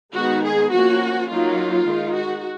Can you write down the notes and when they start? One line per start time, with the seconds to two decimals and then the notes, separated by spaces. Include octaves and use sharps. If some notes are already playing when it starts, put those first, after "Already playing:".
0.15 D#3 G#3 B3 D#4 F#4
0.44 G#4
0.71 F3 A#3 C#4 F#4
1.28 F#3 A#3 D#4 F4
1.86 D#3 G#3 D#4
2.14 F#4